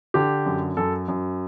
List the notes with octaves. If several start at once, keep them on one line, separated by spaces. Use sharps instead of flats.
D3 G4
F#2
F#2 A4
F#2